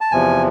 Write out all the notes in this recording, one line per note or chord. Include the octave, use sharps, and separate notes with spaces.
A5
E2 C3 F3 G#5